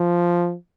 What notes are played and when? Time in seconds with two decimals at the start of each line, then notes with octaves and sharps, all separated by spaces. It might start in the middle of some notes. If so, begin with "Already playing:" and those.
Already playing: F3